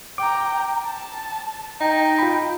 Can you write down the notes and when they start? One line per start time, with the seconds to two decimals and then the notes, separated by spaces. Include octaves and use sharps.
0.18 G5 A#5 D6
0.85 A5
1.81 D#4 G5
2.19 F4 B5